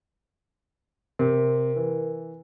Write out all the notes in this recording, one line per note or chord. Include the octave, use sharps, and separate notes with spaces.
C3 A#4
E3